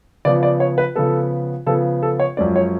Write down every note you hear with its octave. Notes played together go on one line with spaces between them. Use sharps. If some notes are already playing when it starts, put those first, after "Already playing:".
C#3 F3 B3 D5
D5
C#5
B4
C#3 F3 B3 A4
C#3 F3 B3 A4
A4
C#5
F#2 F3 G#3 C#4 D5
C#5